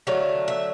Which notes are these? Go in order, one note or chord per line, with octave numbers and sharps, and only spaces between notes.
D3 F#3 A3 F5
E5